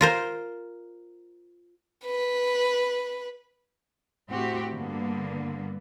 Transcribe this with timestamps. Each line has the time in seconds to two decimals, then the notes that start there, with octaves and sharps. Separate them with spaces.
0.01 F4 A#4 C5
2.06 B4
4.31 A2 C4 F#4 G4
4.72 G2 D3 A#3 B3